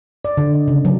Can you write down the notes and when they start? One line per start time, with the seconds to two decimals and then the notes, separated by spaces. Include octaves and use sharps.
0.25 D5
0.37 D3
0.54 D#5
0.68 C#3
0.85 F#3